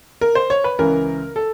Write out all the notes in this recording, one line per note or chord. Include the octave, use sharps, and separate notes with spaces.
A#4
C5
C#5
B4
C#2 C#3 E3 A#4
A4